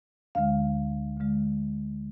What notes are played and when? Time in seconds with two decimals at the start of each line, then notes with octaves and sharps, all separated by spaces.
0.35 D2 D3 G#3 F5
1.17 D2 D3 G#3